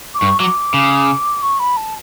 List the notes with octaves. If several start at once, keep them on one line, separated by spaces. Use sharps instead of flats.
D6
G2 C#6
F#3 D6
C#3
C#6
B5
A5